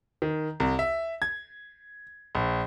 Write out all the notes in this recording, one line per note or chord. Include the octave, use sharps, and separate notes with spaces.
D#3
C2
E5
G#6
A#1